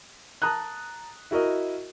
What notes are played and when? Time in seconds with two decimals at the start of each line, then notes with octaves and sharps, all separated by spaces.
0.42 A5 A#5 D#6 F#6
1.31 E4 F#4 A#4 D#5